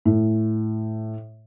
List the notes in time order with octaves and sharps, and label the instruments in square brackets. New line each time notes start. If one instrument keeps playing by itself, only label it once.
[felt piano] A2